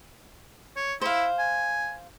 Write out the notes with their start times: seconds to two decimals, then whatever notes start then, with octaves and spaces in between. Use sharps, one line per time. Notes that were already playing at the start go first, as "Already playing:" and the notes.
0.76 C#5
1.01 E4 C5 F5
1.39 G#5